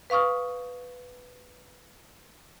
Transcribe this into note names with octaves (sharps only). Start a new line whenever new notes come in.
B4 F5 C#6 D#6 F6